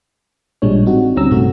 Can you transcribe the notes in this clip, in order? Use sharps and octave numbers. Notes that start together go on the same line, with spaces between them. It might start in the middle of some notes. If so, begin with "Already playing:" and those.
A1 A#2 G3 G#3 D4 C#5
C4 D#4 F#4
D2 G3 C4 C#4 A#5 E6
A#1 G2 C3 A3 F#4